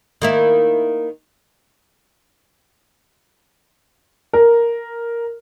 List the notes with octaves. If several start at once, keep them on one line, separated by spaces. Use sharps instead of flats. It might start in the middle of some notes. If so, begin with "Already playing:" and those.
D#3 A#3 E4
A#4